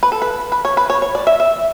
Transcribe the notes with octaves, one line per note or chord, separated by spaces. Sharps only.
B4
A4
B4
B4
C#5
B4
C#5
C#5
D5
E5
E5